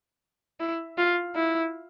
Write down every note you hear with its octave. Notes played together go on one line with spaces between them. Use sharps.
E4
F4
E4